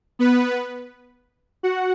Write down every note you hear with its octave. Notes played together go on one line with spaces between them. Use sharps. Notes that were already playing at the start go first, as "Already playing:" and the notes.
B3 B4
F#4 F#5